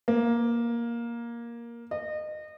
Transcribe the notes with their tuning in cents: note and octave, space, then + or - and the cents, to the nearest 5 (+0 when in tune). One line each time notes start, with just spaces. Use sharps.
A#3 +10
D#5 -30